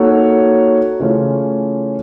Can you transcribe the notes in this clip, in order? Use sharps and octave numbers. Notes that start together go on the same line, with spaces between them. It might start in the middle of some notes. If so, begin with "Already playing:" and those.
Already playing: A#3 D#4 F#4 A4 C#5
C#3 E3 A3 C#4 F4